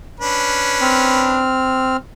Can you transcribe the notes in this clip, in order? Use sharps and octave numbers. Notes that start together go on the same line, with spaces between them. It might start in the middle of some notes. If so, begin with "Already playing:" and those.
C#4 D4 B4
C4 F6